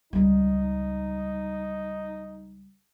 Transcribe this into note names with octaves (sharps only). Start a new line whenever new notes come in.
C#2 G3 D#4